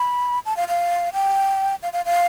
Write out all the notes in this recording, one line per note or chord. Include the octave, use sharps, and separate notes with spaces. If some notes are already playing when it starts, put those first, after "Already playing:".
Already playing: B5
A5
F5
F5
G5
F5
F5
F5